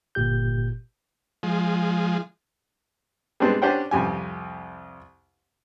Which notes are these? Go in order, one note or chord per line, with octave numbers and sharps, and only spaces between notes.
G1 A#2 G4 G6
F3 G#3
G3 G#3 B3 C4 D4
C#4 D4 G4 C5 F#5 G5
C2 F2 G4 G#5